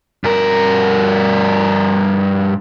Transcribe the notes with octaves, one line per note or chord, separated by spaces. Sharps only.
G2 A#4